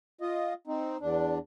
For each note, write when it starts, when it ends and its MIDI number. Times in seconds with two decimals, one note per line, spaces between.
0.21 0.54 65
0.21 0.54 75
0.67 0.97 60
0.67 0.97 63
1.01 1.38 40
1.01 1.38 62